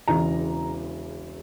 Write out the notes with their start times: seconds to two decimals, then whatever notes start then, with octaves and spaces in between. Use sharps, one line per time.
0.08 E1 E2 C#3 E3 A#5